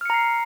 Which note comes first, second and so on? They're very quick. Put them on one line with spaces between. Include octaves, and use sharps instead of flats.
F6 C#7 A#5 C7